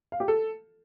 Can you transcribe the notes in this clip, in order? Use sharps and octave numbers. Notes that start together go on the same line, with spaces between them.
F5
G4
A4